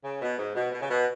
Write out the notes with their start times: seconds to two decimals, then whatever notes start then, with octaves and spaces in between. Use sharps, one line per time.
0.04 C#3
0.22 B2
0.39 G#2
0.56 B2
0.72 B2
0.82 C#3
0.89 B2